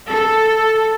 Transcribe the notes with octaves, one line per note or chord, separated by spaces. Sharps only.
A4